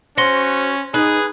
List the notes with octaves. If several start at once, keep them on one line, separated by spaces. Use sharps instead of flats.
C#4 F#4 C5 C6 A#6 C#7
D#4 G#4 B4